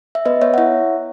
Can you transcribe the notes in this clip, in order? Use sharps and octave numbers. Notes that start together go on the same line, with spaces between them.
E5
B3 B4 D#5
B3 C#5 E5
F#5
E4 C#5 E5